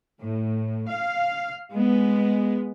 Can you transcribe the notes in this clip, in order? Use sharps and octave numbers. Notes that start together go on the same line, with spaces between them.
A2
F5
G#3 B3